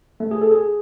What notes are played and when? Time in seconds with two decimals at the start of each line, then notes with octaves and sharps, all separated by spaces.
0.20 A3
0.31 G#4
0.41 A4
0.51 G#4